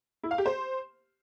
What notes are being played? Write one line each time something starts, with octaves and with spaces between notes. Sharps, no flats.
E4
F5
G4
C5